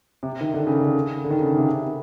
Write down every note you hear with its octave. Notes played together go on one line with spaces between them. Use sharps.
C3
D#3
D3
C#3
D3
D3
D#3
C#3
C3